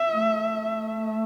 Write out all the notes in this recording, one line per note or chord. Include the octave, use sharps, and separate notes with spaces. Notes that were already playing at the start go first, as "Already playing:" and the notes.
Already playing: E5
A3